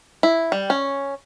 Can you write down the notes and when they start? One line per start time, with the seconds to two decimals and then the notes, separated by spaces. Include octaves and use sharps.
0.23 E4
0.52 G3
0.70 C#4